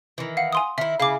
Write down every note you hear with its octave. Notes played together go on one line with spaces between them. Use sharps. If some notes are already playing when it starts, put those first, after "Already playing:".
D#3 E3
F5 F#5
G#5 C6 D#6
D#3 E4 E5
C#3 E4 F5 D6